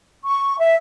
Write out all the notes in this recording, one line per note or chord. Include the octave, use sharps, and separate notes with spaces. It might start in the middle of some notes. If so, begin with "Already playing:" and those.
C#6
E5